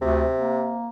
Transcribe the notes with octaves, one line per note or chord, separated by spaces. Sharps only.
D2 C3
A#3